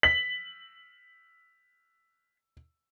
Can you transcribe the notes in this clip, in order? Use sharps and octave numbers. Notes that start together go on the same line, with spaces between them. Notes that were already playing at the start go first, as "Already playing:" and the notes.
B6 F#7